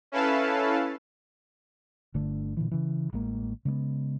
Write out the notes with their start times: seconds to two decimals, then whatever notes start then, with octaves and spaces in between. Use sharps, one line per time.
0.12 C#4 E4 A4 B4 F5 A5
2.14 G1 D3 A3 D4
2.57 A#2 D3 E3
2.71 C#3 E3
3.13 A1 G#3 A#3
3.65 C#3 G#3 A#3 B3